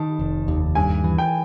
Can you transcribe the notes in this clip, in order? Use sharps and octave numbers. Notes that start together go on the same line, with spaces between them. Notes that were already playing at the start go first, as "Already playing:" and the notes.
Already playing: D#3 A5
F1
D#2
G2 G#5
E3
G5